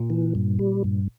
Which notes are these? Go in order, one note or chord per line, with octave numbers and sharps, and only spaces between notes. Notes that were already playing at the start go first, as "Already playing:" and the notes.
Already playing: A#2
E3
G2
G3
G2